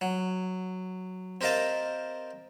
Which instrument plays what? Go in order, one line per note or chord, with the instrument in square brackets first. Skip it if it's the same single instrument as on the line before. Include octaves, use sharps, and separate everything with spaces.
[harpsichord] F#3
C4 G4 A#4 D#5 F5 A5